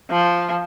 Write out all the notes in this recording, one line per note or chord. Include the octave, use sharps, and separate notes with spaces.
F3